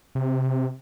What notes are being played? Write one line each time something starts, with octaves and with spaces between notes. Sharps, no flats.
C3